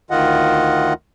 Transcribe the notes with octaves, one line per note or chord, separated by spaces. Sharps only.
D2 D#3 F4 D#5 F#5